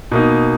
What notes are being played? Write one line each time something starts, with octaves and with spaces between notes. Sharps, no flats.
B2 A#3 D#4